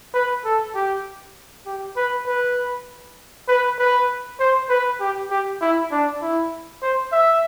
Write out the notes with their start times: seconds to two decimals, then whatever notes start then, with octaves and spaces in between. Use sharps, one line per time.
0.14 B4
0.45 A4
0.75 G4
1.66 G4
1.97 B4
2.27 B4
3.48 B4
3.79 B4
4.40 C5
4.69 B4
5.00 G4
5.30 G4
5.61 E4
5.91 D4
6.22 E4
6.82 C5
7.12 E5